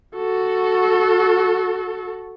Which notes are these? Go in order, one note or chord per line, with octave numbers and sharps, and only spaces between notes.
F#4 A4